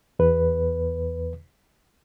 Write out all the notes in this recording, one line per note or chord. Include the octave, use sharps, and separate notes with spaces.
E2 B4